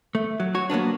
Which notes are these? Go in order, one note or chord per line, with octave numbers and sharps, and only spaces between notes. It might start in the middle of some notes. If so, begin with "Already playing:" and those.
A3
F#3
F#4 C#5
F#3 A#3 B3 D4